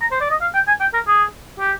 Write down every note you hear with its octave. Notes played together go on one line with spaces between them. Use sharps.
A#5
C5
D5
D#5
F5
G5
G#5
G5
A#4
G#4
G4